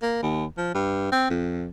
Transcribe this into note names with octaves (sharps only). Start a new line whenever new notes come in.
A#3
D#2
F3
G2
C4
F2